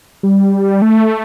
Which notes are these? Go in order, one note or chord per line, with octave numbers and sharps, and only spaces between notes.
G3
A3